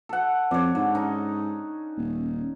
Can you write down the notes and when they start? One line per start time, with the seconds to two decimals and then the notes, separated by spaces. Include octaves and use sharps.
0.09 A4 F#5
0.51 F2 C#5 D5
0.75 G#2 D3
0.95 C#4 D#4
1.98 D#1